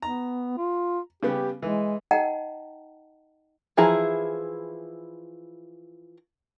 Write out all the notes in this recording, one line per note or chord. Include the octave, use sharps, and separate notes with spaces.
B3 A#5
F4
C#3 G3 B3 G4
E3 G#3
D#4 D#5 F#5 G5 A5 A#5
E3 F3 E4 G#4 A#5